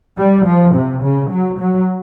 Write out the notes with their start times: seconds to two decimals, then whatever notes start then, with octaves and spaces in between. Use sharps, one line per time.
0.18 G3
0.46 F3
0.75 C3
1.03 C#3
1.30 F#3
1.59 F#3